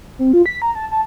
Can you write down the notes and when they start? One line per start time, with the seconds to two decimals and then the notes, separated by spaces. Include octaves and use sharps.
0.19 C4
0.33 F4
0.46 B6
0.62 A#5
0.75 A5
0.91 A5